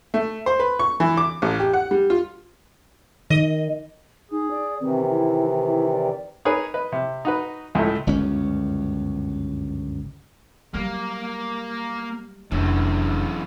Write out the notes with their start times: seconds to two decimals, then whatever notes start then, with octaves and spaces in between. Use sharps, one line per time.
0.14 A3
0.46 C5
0.59 B4
0.79 C#6
1.00 E3
1.17 D6
1.42 A1
1.60 G4
1.73 F#5
1.91 G3
2.10 F4
3.30 D#3 D#5
4.31 D#4 G#4
4.51 D5
4.81 C3 D#3 E3 C4
5.10 E4
5.67 E4
5.92 D5
6.45 D#4 G#4 A#4 B4 C#5
6.74 B4 D#5
6.92 C3
7.25 D#4 F#4 B4
7.75 C#2 A2 F#3 A3
8.07 G1 C#2 F#2 C#4
10.74 F#3 G3 A#3
12.51 F1 F#2 E3 D4